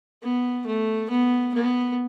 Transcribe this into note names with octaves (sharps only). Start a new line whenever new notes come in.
B3
A3
B3
B3